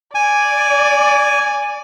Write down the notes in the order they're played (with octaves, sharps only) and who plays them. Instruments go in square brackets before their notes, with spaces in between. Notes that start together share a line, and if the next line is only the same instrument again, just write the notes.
[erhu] D5 [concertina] G#5